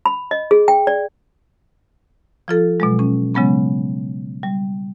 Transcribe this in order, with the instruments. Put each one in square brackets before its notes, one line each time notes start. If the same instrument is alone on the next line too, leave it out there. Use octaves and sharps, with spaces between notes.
[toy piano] B5
D#5
G#4
G5
D5
[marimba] F3 F4 A4
B2 F#3 G#3
C#4
C#3 F#3 G#3 B3 C#4
G3